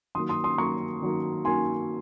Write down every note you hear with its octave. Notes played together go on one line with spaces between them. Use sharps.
D#3 F#3 A#3 C6 D#6
C6 D#6
C6 D#6
D#3 F#3 A#3 A#5 C#6
D#3 F#3 A#3
D#3 F#3 A#3 G#5 C6